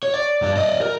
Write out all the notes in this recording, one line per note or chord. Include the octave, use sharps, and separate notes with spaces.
C#5
D5
G2 D5
D5 D#5
A#4